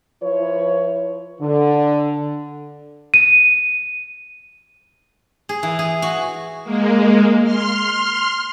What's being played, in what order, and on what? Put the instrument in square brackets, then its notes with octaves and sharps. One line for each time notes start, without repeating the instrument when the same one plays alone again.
[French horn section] F3 E4 B4 C#5
D3
[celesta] D#7
[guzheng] G#4
E3
G#4
F#4
[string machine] G#3 A#3
C6 F6